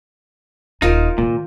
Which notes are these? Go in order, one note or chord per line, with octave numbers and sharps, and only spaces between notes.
D#1 D#4 F4 A#4 C5
A#2 D#3 A#3